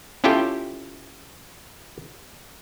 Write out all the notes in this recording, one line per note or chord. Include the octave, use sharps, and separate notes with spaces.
C#4 E4 F4 G4 A4 G5